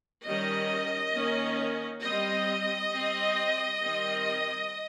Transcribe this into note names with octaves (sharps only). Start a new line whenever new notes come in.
D#3 G3 C#4 D#5
D#3 A#3 C#4
G3 C4 D#5
G3 C4
D#3 G3 C4